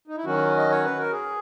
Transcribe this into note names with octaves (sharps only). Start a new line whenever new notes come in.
D#4
E4
D#3 F#3 C#4 F#4
D#5
C#5
B4
A#4
G#4